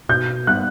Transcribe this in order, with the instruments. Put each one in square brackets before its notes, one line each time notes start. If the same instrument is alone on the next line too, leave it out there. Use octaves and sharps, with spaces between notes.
[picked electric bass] B2 [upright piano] G6
[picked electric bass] G3 B3 [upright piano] F#6